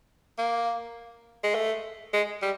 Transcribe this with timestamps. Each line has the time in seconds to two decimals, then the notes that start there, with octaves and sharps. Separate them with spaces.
0.38 A#3
1.43 G#3
1.54 A3
2.13 G#3
2.42 G3